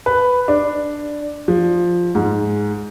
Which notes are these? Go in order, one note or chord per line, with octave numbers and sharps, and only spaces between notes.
B4
D4
F3
G#2